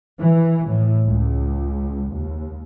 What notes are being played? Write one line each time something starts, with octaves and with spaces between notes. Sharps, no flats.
E3
A2
C#2
D#2